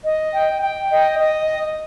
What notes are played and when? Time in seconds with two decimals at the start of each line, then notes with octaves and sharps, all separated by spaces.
0.04 D#5
0.33 G5
0.62 G5
0.91 D#5
1.19 D#5